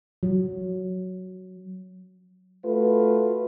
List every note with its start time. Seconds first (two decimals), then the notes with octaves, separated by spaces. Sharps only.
0.23 F#3
2.64 A3 F4 F#4 B4